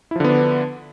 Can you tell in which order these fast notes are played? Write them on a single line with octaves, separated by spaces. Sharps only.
E4 F3 D3 B3 D4